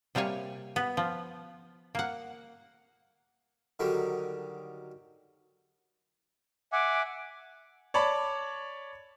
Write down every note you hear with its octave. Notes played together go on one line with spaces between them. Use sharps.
C3 G3 A#3 C#5 G#5
B3
F3
A#3 F#5
D3 D#3 F#3 G3
E5 F#5 G#5 D6
C#5 D5 A5 B5